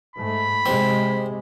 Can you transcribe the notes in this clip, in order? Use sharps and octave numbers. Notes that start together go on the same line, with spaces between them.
G#2 A3 B5
C3 G#3 C4